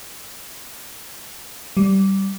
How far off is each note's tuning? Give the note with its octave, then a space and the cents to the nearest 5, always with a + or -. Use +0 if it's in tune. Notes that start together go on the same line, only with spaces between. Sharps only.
G3 -15